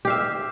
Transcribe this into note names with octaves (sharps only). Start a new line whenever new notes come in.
G4 E5 F5